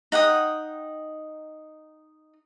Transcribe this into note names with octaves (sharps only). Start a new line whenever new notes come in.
D#4 F#5 G5 D#6